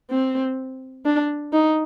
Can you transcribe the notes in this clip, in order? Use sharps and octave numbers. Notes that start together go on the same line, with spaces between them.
C4
D4
D#4